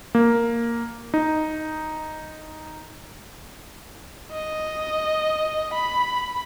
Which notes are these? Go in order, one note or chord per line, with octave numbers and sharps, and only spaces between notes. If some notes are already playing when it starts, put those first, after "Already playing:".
A#3
D#4
D#5
B5